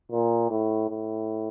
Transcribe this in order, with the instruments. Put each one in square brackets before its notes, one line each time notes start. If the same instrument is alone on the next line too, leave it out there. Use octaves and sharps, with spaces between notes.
[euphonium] A#2
A2
A2